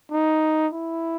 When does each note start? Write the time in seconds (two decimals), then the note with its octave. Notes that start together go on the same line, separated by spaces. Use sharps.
0.11 D#4
0.73 E4